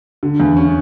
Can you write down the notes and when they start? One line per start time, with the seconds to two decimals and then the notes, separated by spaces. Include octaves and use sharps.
0.23 D3
0.40 E2
0.57 C#4